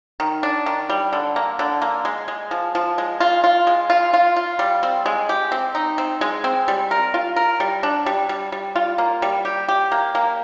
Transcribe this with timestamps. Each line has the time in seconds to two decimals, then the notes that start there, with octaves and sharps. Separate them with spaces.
0.20 D#3
0.43 D4
0.66 D#3
0.89 G3
1.13 D3
1.36 A#3
1.59 D3
1.82 A#3
2.05 G#3
2.28 G#3
2.51 F3
2.75 F3
2.98 G#3
3.20 F4
3.44 F4
3.67 G#3
3.90 F4
4.14 F4
4.36 F4
4.59 G3
4.83 C4
5.06 G#3
5.29 G4
5.52 C4
5.75 D#4
5.98 C4
6.21 G#3
6.44 C4
6.68 G3
6.91 A#4
7.14 F4
7.36 A#4
7.60 G3
7.83 D4
8.06 G3
8.29 G3
8.52 G3
8.76 F4
8.98 A#3
9.22 G3
9.45 G4
9.68 G4
9.92 A#3
10.15 A#3